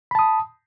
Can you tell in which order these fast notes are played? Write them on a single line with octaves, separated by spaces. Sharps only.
B5 A5 D#6